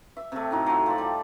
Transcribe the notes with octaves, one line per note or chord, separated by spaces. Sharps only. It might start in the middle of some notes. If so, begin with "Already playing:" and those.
E5
C3 A3
A2 D#4 F#4
F#3 F4
F3 D5
G3